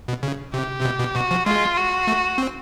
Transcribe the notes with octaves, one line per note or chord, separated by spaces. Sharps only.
B2
C#3
C3 G4
C3
B2
B2
B2 F#4
F3
G#3 F4
F#4
A3
C4